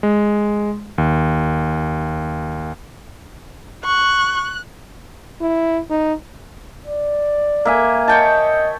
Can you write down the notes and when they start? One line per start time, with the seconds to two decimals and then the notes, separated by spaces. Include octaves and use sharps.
0.03 G#3
0.98 D#2
3.85 C#6 F#6
5.41 E4
5.90 D#4
6.86 D5
7.65 A#3 E5 G#5
8.08 C#5 D#5 G5 A5